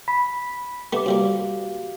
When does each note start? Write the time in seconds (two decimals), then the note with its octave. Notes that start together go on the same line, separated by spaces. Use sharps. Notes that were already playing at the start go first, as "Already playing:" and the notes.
0.08 B5 B6
0.93 A3 B3 G4 D6
1.06 C3 G3 A#3 F#4 G4 F5